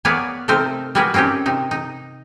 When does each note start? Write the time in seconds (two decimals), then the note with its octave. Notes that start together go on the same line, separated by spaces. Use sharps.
0.05 A#3 B3 G#4 C#5 D5 F5
0.48 C3 A3 C4 D#4 A#4 C5
0.95 G3 F4 F#4 G#4 A#4 B4
1.14 A#3 C4 C#4 D#4 G4
1.46 C3 D#4
1.71 D#4